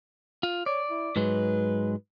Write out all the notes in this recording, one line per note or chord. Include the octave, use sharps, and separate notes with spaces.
F4
C#5 D5
E4
G#2 F#3 G#3 B4